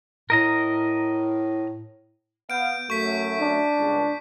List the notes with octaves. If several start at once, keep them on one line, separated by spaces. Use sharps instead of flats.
A2 A#4 D#5 A#5
B3 F5 F#5 G6 D7
F#2 A3 C#6 B6
D4
G1 C#2